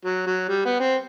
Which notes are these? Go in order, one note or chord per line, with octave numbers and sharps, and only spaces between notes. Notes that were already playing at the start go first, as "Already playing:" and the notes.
F#3
F#3
G3
B3
C4